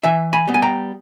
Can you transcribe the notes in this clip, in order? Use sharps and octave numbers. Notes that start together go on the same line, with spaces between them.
E3 E5 G#5
G#5 B5
G3 B3
G#5
G5 A#5